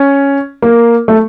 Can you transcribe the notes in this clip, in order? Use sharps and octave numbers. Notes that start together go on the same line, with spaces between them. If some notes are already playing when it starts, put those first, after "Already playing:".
Already playing: C#4
A#3
A3